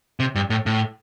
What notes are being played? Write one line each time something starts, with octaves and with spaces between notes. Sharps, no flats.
C3
G2
A2
A2